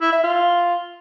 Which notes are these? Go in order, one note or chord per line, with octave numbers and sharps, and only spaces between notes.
E4
E5
F4